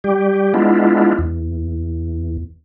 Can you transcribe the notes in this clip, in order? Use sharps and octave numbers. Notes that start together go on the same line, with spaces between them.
G3 G4
G#3 B3 D4 E4 F4
E2